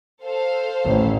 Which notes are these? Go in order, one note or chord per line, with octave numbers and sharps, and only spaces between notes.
A4 C5 F5
A1